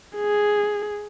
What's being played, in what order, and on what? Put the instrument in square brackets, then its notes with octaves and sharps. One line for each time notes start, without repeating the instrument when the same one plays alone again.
[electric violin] G#4